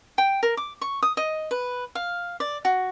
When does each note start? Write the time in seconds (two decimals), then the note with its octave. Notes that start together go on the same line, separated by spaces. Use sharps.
0.18 G5
0.43 A#4
0.57 D6
0.81 C#6
1.03 D#6
1.17 D#5
1.51 B4
1.95 F5
2.40 D5
2.65 F#4